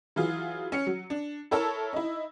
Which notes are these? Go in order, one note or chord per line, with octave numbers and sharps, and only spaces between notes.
E3 F#3 F4 G#4
C#4 C#7
F#3
D4
E4 A4 A#4 C#5 A5 E6
D#4 E4